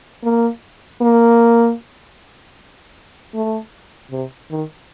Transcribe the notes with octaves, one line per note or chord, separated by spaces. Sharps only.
A#3
A#3
A3
C3
D#3